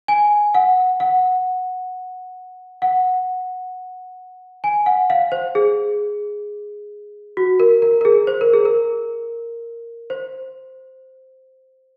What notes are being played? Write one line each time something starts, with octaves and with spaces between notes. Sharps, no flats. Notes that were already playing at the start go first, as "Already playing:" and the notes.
G#5
F#5
F#5
F#5
G#5
F#5
F5
C5
G#4
F#4
A#4
A#4
A#4
G#4
C5
A#4
G#4
A#4
C5